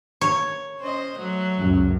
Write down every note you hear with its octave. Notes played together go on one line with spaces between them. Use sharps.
C#5
C#4 C5 D#5
F#3 A3
C#2 F#2